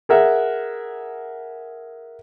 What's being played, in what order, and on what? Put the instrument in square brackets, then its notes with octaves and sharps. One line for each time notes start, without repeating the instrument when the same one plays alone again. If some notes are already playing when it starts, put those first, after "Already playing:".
[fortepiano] G#4 A#4 E5 F#5